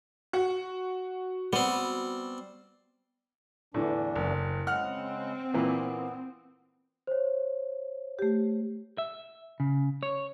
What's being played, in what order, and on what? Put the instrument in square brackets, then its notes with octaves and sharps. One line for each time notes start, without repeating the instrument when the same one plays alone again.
[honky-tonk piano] F#4
[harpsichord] G3 C4 [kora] B3
[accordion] E2 E3 D4 [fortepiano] A2 D3
[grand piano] F#1
[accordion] C#3 G#3 [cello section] C4 [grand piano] F#5 F6
[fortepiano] A#2 E3 A#3 [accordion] B3
[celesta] C5 C#5
[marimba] A3 G4
[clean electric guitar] E5
C#3
C#5